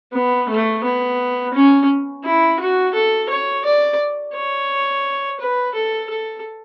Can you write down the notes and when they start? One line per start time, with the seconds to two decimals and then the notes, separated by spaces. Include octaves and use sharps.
0.13 B3
0.49 A3
0.83 B3
1.53 C#4
2.24 E4
2.60 F#4
2.94 A4
3.29 C#5
3.65 D5
4.34 C#5
5.40 B4
5.75 A4
6.10 A4